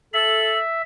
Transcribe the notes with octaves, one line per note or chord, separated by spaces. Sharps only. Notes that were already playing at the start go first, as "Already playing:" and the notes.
A4 E5 F#7